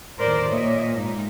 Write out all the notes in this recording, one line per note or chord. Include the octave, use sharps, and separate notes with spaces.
D#2 A2 A#4 C5 D5
A#2 C#5 D#5 E5
G#2 D#4